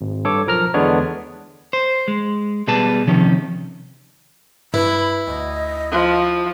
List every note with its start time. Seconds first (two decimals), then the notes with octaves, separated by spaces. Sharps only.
0.01 G#1
0.25 G2 A4 C#5 D6
0.47 B1 F3 A#4 A#5 F6
0.74 E2 D3 G#3 B3 D4 C#5
1.73 C5
2.08 G#3
2.67 B2 G3 G#4 B4 A5
3.07 C3 D#3 F3 C#4
4.74 G2 E4 B4 B5
5.27 D2 D#5
5.91 F3